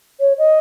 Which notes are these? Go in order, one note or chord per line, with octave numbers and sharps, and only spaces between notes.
C#5
D#5